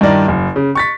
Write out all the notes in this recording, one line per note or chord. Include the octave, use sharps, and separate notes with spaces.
G2 D#3 E4 D5 A#5
F#1
C#3
C#6 A6 B6